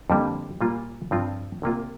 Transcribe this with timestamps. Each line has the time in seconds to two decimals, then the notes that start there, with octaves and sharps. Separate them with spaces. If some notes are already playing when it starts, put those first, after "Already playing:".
0.10 F2 D3 G3 A#3
0.61 A#2 G3 A#3 F4
1.11 G2 F3 C4 F4
1.62 C2 C3 A#3 F4